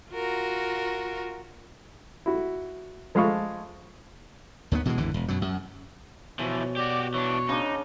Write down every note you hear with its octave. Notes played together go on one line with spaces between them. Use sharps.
F4 F#4 A#4
E4 F#4
F3 G#3 A3 F5 B5 C#6
D#2 D#3 E3 B3
B2 E3 G#3
G#1 E2 D3 E3
E1
F#2 B2 F#3
F#2
B2 E3 F3 C#5
F#4 G4 D5
E3 D4 C#5
C#3 D4 D#4